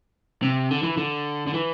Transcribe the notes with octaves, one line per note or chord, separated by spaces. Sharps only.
C3
D3
E3
D3
D3
E3